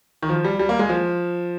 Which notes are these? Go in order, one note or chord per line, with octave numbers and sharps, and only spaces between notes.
D#3
F3
G3
G3
A#3
G#3
F3